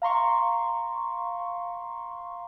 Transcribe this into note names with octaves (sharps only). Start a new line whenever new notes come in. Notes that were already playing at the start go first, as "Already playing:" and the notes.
F5 A#5 C6 C#6